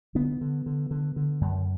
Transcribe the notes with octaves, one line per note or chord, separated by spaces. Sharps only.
D3 B3
D3
D3
D3
D3
F#2